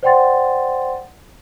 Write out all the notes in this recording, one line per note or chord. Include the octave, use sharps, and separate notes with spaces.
C5 D5 F#5 G5 C6 A6